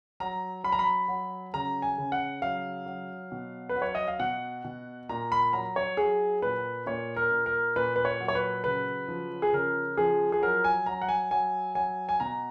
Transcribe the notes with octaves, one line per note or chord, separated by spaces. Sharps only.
F#3 A#5
F#3 B5
A#5
B5
F#3
C#3 A#5
G#5
C#3
F#5
F#3 F5
F#3
B2
B4
F#3
C#5
D#5
F5
B2 F#5
B2
A#2 A#5
B5
F#3 A#5
C#5
F#3 G#4
A#2 B4
A#2 C#5
A#4
A#2
A#4
A#2 B4
B4
C#5
F#3
C#5
B4
C#3 B4
F3
G#4
C#3 A#4
F3 G#4
G#4
F#3 A#4
G#5
F#3 A#5
F#5
G#5
F#3 G#5
F#3 G#5
G#5
B2 A#5